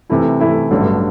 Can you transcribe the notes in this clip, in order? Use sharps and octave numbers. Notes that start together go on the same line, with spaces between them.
C3 E3 A3 E4
C3 E3 A3 E4
A1 G2 D3 F#3